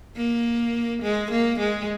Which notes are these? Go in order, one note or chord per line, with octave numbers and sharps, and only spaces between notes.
A#3
G#3
A#3
G#3